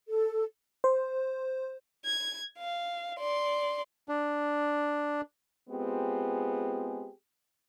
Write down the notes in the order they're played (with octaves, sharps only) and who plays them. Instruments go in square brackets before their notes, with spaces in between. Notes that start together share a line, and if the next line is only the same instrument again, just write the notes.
[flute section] A4
[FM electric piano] C5
[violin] G#6
F5
D5 C6
[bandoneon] D4
[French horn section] G#3 B3 C4 F4 G4 G#4